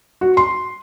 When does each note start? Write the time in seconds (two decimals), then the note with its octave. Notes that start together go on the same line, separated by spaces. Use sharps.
0.21 F#4
0.37 C6